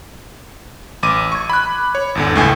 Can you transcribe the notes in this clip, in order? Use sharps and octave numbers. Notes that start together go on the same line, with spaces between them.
A1 D6 D#7
C#6 G#6
B5 F#6
C#5
G#1 E2 D3
C#2 A2 G#5